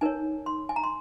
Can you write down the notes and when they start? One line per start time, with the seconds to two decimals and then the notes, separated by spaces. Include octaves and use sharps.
0.01 D#4 A#4 C#5 G#5
0.46 C6
0.69 G#5
0.76 A#5
0.84 C6